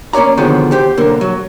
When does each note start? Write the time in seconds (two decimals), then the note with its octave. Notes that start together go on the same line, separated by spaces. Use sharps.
0.13 A#3 C#4 C#5 D5 A#5
0.37 D2 B2 D3 D#3 F3 G#3
0.71 B2 G4 C5
0.97 B1 D3 A#3 A#4
1.21 F#3